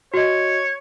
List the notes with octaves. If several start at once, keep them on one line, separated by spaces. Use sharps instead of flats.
F#4 C#5 D#5